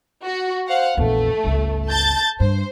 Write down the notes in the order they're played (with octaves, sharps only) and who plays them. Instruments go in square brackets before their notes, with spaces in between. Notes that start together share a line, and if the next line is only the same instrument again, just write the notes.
[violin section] F#4
C5 F5 F#5
[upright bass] A#1 E2 [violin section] A3
[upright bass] G1 C#2
[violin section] A5 G6 A6
[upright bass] G2 [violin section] C5